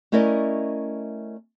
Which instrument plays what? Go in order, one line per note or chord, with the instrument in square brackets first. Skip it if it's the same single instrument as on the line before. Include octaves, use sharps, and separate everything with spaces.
[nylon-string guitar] A3 C#4 E4 A#4 D5 D#5